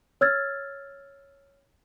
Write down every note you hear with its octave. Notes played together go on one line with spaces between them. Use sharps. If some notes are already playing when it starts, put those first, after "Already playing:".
C#5 E6 F6 G#6 A6